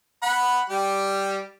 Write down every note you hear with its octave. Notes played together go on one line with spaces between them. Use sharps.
F#5 B5
G3 G4